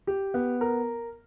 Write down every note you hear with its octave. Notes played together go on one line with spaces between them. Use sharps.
G4
B3
A#4